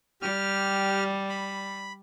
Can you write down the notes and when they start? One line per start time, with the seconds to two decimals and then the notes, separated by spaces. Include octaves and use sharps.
0.22 G3 G4 F6
1.29 B5